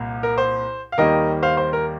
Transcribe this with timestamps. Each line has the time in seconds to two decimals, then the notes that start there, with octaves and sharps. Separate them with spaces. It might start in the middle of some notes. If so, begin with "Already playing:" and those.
Already playing: C2 A#2
0.23 A#4
0.38 C5
0.92 F5
0.98 D#2 D#3 G3 A#3 A#4 D#5
1.43 C5 F5
1.57 C5
1.73 A#4